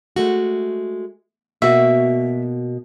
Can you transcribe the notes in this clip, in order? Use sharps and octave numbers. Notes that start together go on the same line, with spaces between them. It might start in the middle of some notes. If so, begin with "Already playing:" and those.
G#3 A3 F#4
B2 A#3 F#4 E5